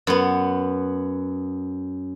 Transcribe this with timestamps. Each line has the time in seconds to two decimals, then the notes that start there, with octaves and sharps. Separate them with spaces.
0.07 F#2 B3